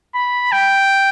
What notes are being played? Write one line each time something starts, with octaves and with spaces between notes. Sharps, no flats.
B5
G5